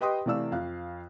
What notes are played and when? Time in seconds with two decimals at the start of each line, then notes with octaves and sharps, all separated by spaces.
0.01 G4 B4 D#5 G5 C6 D#6
0.26 C3 E3 A3 D5 F5 E6
0.52 F2 F5 F#6